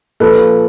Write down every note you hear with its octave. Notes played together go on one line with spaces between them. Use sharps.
A#2 F3 A4 B4